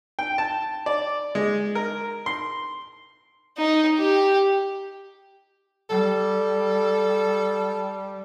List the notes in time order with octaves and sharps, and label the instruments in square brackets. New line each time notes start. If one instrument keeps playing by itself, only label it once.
[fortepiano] G5
A5
D5
G#3
A#4
C6
[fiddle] D#4
G4
[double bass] G3 [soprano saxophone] A4